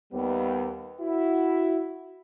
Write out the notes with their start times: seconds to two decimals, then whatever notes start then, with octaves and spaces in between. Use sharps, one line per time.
0.13 D#2 G3 B3
1.00 E4 F#4